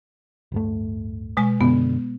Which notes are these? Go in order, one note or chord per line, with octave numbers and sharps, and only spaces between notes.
D1 G2 A3
B2 G#3 G#5
F#2 B2 D3 B3